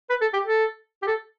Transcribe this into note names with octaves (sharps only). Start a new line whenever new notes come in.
B4
A4
G4
A4
G4
A4